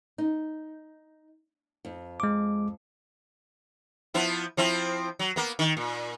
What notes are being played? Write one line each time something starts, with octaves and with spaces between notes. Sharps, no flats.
D#4
F2
G#3 D6
F3 B3 E4
F3 C4 E4
F#3
A#3 B3
D#3
A#2